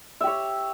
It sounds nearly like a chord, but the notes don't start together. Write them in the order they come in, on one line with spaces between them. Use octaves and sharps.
E5 G4 C#5